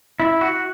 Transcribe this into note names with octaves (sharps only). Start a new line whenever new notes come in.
E4
F#4